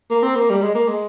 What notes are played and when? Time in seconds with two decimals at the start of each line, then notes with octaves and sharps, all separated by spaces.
0.11 A#3
0.23 C4
0.36 A#3
0.50 G3
0.62 G#3
0.75 A#3
0.88 G#3